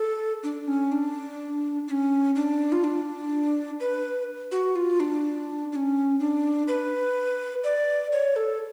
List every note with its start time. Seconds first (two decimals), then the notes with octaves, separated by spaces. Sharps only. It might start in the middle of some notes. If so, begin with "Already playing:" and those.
Already playing: A4
0.43 D4
0.68 C#4
0.92 D4
1.88 D4
1.91 C#4
2.35 D4
2.72 F4
2.84 D4
3.80 B4
4.52 F#4
4.75 F4
5.00 D4
5.72 D4
5.76 C#4
6.20 D4
6.68 B4
7.64 D5
8.12 C#5
8.36 A4